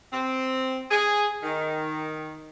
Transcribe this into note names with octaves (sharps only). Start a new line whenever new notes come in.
C4
G#4
D#3